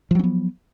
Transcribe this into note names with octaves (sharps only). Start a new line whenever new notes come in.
F3 F#3 B3 C#4